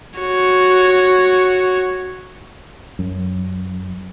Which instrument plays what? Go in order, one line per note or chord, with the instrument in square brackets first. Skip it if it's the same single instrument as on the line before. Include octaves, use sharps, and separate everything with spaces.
[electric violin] F#4 C#5
[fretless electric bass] F#2